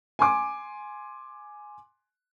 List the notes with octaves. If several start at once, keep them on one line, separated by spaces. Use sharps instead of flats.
G#5 C6 D6